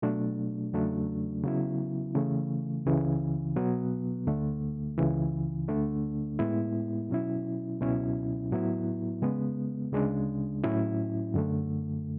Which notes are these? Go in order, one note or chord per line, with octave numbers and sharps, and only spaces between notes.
B2 F#3 A3 D4
E2 C#3 F#3 A3 D4
C#3 F#3 B3 E4
C#3 E3 A3
C#2 C#3 E3
B2 F#3 B3
D2 D3 A3
C#2 C#3 E3
D2 D3 A3 D4
A2 G#3 B3 E4
B2 F#3 C#4 E4
C#2 B2 F#3 C#4 E4
A2 F#3 B3 E4
C#3 G#3 B3
D2 C#3 G#3 D4
A2 F#3 C#4 E4
F#2 D3 A3